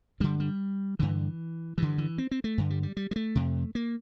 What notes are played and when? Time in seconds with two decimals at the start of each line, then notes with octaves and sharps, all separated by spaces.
0.20 G2 D3 G3
0.40 G3
0.99 G2 D3 E3
1.78 G2 D3 E3
1.98 E3
2.18 C4
2.31 C4
2.44 A3
2.58 G2 D3
2.70 G3
2.83 G3
2.97 G3
3.11 G3
3.16 A3
3.35 F2 C3
3.75 A#3